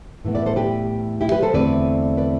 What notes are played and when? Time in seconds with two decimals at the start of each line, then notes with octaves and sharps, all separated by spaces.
0.25 A2 E3 B3
0.35 B4 D5
0.46 A4 C5
0.56 G4 B4
1.21 E4 G4
1.31 G4 B4
1.42 A4 C5
1.53 E2 D3 A3 C4 B4 D5
2.17 B4 D5